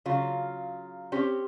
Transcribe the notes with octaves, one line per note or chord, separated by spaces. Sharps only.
C#3 F#3 F4
C4 C#4 G4